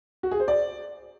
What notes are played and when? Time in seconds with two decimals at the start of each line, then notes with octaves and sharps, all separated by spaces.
0.23 F#4
0.31 G#4
0.40 C5
0.48 D5